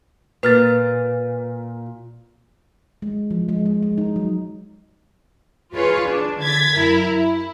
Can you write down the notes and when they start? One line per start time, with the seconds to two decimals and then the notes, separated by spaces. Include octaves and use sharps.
0.43 A#2 B4 F6 A6
3.02 G#3
3.31 F3
3.49 G#3
3.66 G#3
3.82 G#3
3.98 D#4
4.16 F#3
5.75 F4 G#4 B4 C#5
6.08 D4
6.42 D3 G#6 A6 B6
6.78 F#2 E4 A#4
7.16 E4